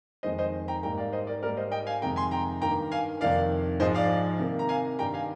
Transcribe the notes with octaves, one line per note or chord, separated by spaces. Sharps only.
F2 D#3 G#3 C5 D#5
C5 D#5
G5 A#5
G#2 G3 A#3 G5 A#5
D5 F5
C5 D#5
A#4 D5
G#2 G3 A#3 A#4 D5
C5 D#5
D#5 G5
F5 G#5
F2 C3 D#3 G#3 G5 A#5
G#5 C6
G5 A#5
G2 D#3 A#3 G5 A#5
F5 G#5
F2 C3 D#3 A#3 D5 F5
G#2 F3 G#3 C5 D#5
D5 F5
C3 D#3 A#3
A#5
F5 G#5
G2 D#3 G3 G5 A#5
F5 G#5